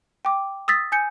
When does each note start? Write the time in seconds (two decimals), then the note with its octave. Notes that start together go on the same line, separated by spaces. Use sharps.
0.25 G5 D6
0.68 D#6 E6 A6 B6
0.92 G#5 G6 C#7